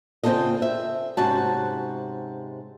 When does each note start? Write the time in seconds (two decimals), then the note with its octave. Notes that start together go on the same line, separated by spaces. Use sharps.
0.23 C#3 C4 D4 F4 A4 D#5
0.62 E5
1.17 G#2 C3 C#4 F#4 A5